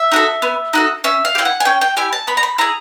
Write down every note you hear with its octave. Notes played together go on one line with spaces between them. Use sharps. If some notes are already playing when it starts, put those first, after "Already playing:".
Already playing: E5
D#4 F#4 A4
B3
D#4 F#4 A4
C#4 E5
F5
G4
E4 G5
F#5
G#5
C#4 G5
G5
E4 G4 G#5
A5
B3 B5
A#5
B5
E4 G#4 A#5